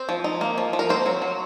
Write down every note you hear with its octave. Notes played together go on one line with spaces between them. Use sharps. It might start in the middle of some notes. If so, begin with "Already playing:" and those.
Already playing: C4 C5
F3
D#4
A#3
F3
F3
A#4
A#3 C4 C5
F#3
F#3